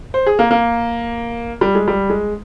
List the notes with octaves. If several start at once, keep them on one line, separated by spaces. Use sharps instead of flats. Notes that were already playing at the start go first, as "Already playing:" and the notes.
C5
G#4
A#3
A#3
G3
G#3
G3
G#3